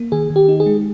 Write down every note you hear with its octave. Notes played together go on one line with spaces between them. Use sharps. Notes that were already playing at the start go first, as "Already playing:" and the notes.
Already playing: A#3
D#3 G#4
D#3
G4
D#4
G#4
G#3